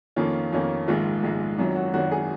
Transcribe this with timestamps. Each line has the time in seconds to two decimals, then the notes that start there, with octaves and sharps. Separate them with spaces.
0.16 F2 D#3 A#3 C#4 F4
0.53 F2 D#3 A#3 C#4
0.88 A#1 G#2 D#3 G#3 F4
1.23 A#1 G#2 D#3 G#3
1.58 G#1 F#2 D#3 F#3 F4
1.76 F#4
1.93 G#1 F#2 D#3 F#3 F#4
2.11 G#4